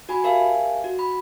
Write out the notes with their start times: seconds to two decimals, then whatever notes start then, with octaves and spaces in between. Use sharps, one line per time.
0.09 F#4 G#5 B5
0.24 G4 A#4 E5 F5 G#5 A5
0.84 F#4
0.99 B5